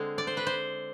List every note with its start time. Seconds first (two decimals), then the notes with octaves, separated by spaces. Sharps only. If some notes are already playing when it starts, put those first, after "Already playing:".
Already playing: D3 G#3 C4
0.18 D5
0.27 C5
0.37 B4
0.47 C5